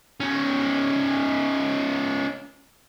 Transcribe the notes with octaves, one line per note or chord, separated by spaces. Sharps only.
C#4 D#4